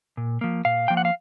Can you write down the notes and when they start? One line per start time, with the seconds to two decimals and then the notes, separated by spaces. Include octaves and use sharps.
0.17 A#2
0.41 F3 A#3
0.65 A#2 F5
0.88 F3 A#3 G5
0.97 F#5
1.05 F5